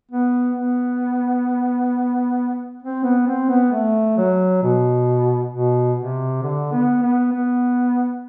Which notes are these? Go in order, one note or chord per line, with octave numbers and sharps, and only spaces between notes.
B3
B3
C4
B3
C4
B3
A3
F#3
B2
B2
C3
D3
B3
B3
B3